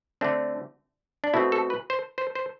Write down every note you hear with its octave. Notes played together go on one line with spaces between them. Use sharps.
D3 A3 C4 D4
D4
B2 A3 C4 E4
A4
B4
C5
C5
C5